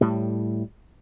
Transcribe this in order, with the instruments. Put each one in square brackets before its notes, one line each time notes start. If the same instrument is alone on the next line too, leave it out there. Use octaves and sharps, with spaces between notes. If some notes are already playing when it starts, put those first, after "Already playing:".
[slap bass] A2 G3